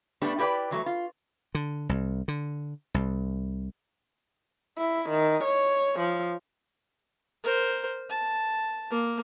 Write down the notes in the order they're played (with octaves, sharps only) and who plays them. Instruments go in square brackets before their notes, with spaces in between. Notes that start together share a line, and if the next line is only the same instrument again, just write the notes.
[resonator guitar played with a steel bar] A2 G3 A3 B3 D4 G4
E4 G4 B4 C#5 D5 G5
E3 F#3 A3
F4
[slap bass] D3
C2
D3
C2
[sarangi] E4
D#3
C#5
F3
[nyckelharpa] A#4 C5
A5
A#3